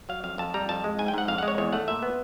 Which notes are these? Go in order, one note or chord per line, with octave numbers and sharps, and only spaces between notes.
F#3 F5
F2 F5
F2 A5
G3 A#5
F2 A5
G#3
G#2 G#5
G5
G#2 F#5
F2 F5
F#5
G#3
C#5
E2 C#5
A3 F#5
A#2 E5
B3